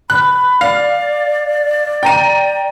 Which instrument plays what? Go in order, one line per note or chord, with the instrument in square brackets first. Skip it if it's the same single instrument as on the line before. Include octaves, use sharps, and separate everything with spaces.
[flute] B5 [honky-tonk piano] F#6
[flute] D5 [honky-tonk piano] F5
[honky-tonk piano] G5 A#5 D#7